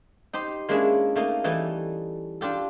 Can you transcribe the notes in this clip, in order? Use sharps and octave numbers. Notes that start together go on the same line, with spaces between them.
D#4 G4 C5
G#3 A#3 C#4 D4 E4 G#4
A3 A#3 D#4
E3 G3 A3 D#4
D4 F4 G4 A4